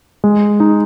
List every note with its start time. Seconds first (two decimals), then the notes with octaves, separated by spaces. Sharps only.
0.24 G#3
0.60 D#4